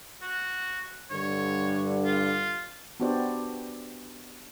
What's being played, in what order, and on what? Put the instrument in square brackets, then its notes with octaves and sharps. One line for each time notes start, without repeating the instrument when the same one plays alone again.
[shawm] F#4
[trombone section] G2 D3 [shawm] C#5
[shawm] F4
[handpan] B3 D4 F#4 G4 C5 D5